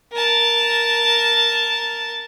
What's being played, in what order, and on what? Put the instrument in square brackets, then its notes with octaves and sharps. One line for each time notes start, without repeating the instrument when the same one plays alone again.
[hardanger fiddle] A#4 A5